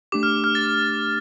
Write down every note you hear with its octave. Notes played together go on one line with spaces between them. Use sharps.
A3 D4 G4 D6
F6
F6
A6